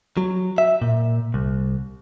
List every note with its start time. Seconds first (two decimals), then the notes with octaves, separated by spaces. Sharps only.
0.17 F#3
0.58 E5
0.82 A#2
1.34 C2